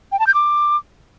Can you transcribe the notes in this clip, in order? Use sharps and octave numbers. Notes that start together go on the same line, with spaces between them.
G5
A5
G6
D6